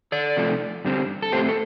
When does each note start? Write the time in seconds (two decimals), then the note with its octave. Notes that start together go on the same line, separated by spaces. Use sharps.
0.12 A4 D5
0.37 C3 F3 A3
0.85 G2 D3 G3 C4
1.22 A4
1.32 A2 A3 C4 G4 C5
1.49 A4